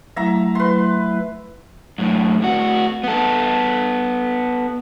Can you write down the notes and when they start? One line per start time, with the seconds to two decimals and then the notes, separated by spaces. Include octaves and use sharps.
0.16 F#3 A3 E4 E5 A#5
0.55 B4 C6
1.98 F#2 A2
2.41 A2 F#4
3.04 B3 A4